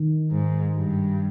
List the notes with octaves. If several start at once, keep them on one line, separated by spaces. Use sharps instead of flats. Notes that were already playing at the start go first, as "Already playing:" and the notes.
Already playing: D#3
G#2
G2